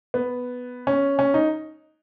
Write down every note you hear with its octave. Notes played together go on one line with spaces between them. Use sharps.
B3
C#4
C#4
D#4